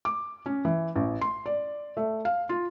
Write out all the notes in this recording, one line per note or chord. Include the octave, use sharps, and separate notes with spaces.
D6
C#4
E3
A1
C6
D5
A3
F5
F4